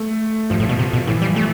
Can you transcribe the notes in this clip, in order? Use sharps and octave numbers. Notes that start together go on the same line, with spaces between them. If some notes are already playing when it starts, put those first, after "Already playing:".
Already playing: A3
G2 F3
A2
B2
C3
B2
A2 E3
G3
A3